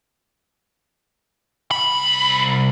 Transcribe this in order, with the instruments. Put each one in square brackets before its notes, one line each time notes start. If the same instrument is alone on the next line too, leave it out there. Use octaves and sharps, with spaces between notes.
[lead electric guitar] C2 B5